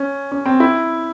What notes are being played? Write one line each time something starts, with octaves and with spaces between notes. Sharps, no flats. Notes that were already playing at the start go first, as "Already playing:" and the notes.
Already playing: C#4
C#4
C4
E4